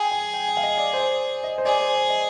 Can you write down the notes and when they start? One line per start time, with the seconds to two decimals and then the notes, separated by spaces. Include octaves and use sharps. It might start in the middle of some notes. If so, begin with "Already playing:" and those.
Already playing: G#4 G5
0.12 G#5
0.34 G5
0.48 G5
0.57 F5
0.63 D#5
0.78 D5
0.93 C5
1.00 D5
1.44 D#5
1.58 C5
1.65 G#4 D5
1.80 C5
1.95 D5
2.10 D#5